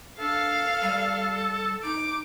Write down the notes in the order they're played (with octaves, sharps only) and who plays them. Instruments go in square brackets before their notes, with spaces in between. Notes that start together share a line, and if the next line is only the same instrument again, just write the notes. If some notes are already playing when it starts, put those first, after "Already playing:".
[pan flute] D4 [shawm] A4 [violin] F5
[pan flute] G3
[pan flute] D#4 [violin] D6